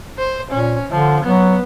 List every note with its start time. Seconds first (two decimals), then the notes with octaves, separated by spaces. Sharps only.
0.19 C5
0.51 A#2 C#4
0.91 D3 F3
1.24 F#3 B3